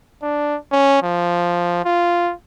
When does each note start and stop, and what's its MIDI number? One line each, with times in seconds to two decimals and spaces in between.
0.23 0.56 62
0.72 1.00 61
1.03 1.80 53
1.85 2.32 65